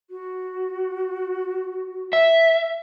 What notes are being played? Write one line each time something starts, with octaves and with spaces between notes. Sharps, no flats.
F#4
E5